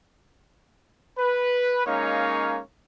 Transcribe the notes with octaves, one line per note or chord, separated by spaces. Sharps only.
B4
G#3 A#3 C#4 D#4 C#5 F5